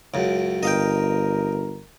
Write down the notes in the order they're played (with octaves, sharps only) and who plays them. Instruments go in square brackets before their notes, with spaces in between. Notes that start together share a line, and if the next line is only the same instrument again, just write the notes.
[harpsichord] C#2 F#2
[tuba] G1 [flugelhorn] A#4 [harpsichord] D#5 F5 G5